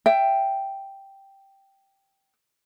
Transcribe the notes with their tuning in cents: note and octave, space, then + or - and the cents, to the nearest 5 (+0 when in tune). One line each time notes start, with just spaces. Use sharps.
E5 +20 G5 +0